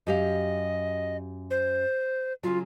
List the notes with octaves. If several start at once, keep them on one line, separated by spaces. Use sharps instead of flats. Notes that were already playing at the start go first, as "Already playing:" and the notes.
F#2 G4 D#5 F5
C5
C#3 F#3 F4